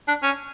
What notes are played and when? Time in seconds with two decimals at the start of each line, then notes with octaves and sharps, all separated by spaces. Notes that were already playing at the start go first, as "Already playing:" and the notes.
0.08 D4
0.23 C#4